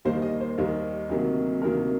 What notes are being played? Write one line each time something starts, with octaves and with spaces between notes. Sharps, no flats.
D#2 D#3 G3 A#3 C5
D#5
C5
D#2 D#3 G3 A#3
D2 C3 D#3 F#3 A#3
D2 C3 D#3 F#3 A#3 A#4